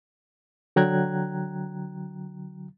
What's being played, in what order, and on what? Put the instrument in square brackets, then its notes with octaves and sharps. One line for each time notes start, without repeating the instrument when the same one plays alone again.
[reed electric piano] D3 F#3 G5 A#5 F#6 G#6